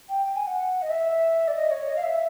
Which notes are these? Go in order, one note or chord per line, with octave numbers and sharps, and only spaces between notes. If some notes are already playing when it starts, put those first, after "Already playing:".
G5
G5
G#5
F#5
D#5
E5
D5
D#5
C#5
D#5
F5
E5